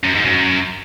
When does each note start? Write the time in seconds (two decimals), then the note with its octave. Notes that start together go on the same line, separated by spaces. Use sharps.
0.04 F#2
0.15 G#2
0.25 F#2